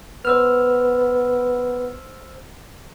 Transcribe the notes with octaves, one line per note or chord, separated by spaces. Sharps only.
B3 C5 E6 F6